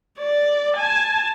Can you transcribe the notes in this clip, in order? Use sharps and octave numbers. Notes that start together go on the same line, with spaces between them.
D5
G#5 A5